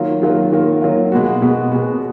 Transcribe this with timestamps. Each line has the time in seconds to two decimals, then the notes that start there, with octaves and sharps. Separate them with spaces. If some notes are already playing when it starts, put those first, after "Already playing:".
Already playing: D#3 F#3 A#3 F4
0.22 D#3 F#3 A#3 F4
0.52 D#3 F#3 A#3 F4
0.82 D#3 F#3 A#3 F4
1.12 B2 G#3 B3 F#4
1.42 B2 G#3 B3 F#4
1.72 B2 G#3 B3 F#4